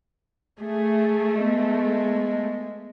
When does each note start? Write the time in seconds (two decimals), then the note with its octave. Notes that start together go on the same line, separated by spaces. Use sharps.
0.61 A3 G#4
1.41 G#3 B3